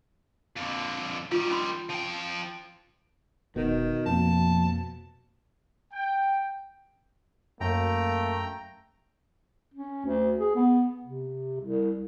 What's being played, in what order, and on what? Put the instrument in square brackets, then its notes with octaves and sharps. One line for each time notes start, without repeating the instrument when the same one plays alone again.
[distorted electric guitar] F2 D3
[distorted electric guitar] D#3 G3 [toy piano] F4
[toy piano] C#4 B5 C6
[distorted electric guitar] F3 G5
[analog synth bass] E1 [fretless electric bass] B2 [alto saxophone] D#3
[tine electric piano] F2 A#3 [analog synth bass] F3 [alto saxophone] A5
[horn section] G5
[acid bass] F#2 [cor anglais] A3 [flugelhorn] A#3 [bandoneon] G5 A#5
[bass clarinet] C#4
D2
G#4
B3
C3
C2